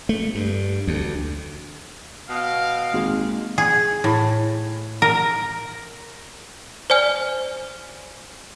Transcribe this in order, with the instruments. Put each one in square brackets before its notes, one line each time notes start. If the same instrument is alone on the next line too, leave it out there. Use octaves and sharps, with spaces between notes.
[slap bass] A3
G2
D2
[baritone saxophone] B2 [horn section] F5
[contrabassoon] G#1 [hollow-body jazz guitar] A#2 G#3
[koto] G#4
A2
A#4
[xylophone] C5 D5 G#5 F6